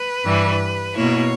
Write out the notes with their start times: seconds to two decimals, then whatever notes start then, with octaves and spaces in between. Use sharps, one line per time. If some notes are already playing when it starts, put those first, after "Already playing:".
Already playing: B4
0.24 G2 E3 G3
0.95 B2 A#3 E4 C#5